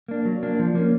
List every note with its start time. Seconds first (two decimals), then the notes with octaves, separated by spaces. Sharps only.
0.08 A#3 D4
0.25 F#3
0.43 A#3 D4
0.59 F3
0.75 A#3 C#4